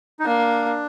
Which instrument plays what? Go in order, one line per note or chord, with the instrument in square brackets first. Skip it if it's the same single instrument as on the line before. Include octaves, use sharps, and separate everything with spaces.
[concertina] D#4
[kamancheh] A#3 [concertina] D4